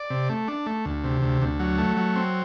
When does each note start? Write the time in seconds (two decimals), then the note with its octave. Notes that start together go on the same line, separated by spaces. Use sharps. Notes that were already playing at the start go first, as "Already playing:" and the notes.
Already playing: D5
0.10 C3
0.29 A3
0.48 D4
0.66 A3
0.85 D2
1.04 C3
1.22 D2
1.42 D2
1.60 F#3
1.78 A3
1.97 F#3
2.16 C4